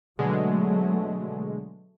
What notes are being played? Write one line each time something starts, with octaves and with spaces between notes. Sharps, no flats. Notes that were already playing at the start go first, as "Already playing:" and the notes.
B2 D3 F#3 G#3 A3